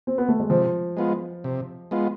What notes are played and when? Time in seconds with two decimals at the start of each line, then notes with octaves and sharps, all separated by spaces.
0.07 C4
0.18 B3
0.28 A3
0.40 G#3
0.50 C3 F3
0.97 G#3 B3 F4
1.44 C3
1.91 G#3 B3 F4